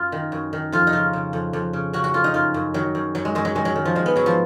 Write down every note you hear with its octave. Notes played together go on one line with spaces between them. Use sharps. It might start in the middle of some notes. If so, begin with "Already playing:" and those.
Already playing: F#2 F4
D#3
F#2
D#3
F2 F4
D#4
C#3 F4
C#3
F2
F2
C#3
C#3 F#4
F#4
F2 F4
D#4
F#2 F4
F#2
D#3 F#3
F#2
F#2 F#3
G#3
F#2 G#3
F#3
D#3 G#3
F#3
D#3
F3
D#3 G#3
B3
G#2 F#3
F3